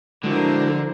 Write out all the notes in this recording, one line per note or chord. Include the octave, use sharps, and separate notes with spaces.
D3 F3 G#3 D4 E4 F#4 A#4 C5